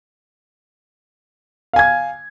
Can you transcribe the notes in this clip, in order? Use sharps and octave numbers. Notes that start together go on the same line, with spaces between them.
F5 G#5 G#6